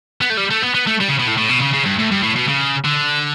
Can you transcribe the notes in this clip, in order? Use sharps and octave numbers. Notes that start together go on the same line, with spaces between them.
B3
A3
G3
A3
B3
B3
A3
G3
C#3
B2
A2
A2
B2
C#3
C#3
G2
A2
G2
A2
B2
C#3
D3